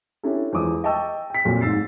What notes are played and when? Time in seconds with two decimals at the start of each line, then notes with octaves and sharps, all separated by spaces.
0.23 C#4 D4 E4 G4 A4
0.53 E2 F3 G#3 D6 D#6
0.84 D#5 G5 A5 C#6 E6
1.30 G5 B6
1.45 F2 A#2 F#3
1.61 D1 G#2 E6 A6 C7